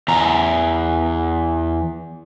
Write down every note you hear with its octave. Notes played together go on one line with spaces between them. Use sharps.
E2 A#5